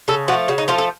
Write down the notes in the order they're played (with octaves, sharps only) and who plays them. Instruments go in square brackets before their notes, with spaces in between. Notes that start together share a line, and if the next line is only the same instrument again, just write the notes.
[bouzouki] C#3 A4
F3 F#4
A3
C#3 F#4
D#4
F3 A3 F4
A4